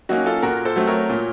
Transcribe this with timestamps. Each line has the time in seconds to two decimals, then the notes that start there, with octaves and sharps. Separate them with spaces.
0.09 F#3 A#3 C#4 D#4 F#4
0.26 F4 A4
0.42 A#2 F#4 A#4
0.65 A4 C5
0.76 F#3 A3 C4
0.87 A#4 C#5
1.10 A#2